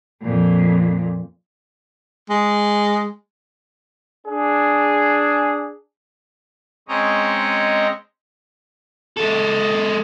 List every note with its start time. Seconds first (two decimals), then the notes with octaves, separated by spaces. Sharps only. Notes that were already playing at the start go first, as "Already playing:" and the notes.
0.23 F2 A#2
2.30 G#3
4.27 D4 G#4
6.89 G#3 C4 C#4 C#5 D#5 A#5
9.17 G#3 A4